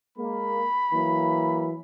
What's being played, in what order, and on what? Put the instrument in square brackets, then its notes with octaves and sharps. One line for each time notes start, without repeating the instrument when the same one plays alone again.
[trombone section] G#3 A#3 [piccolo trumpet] B5
[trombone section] E3 F#3 A#3